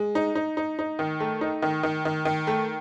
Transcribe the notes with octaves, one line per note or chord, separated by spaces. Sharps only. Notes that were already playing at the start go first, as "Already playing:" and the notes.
Already playing: G#3
D#4
D#4
D#4
D#4
D#3
A3
D#4
D#3
D#3
D#3
D#3
A3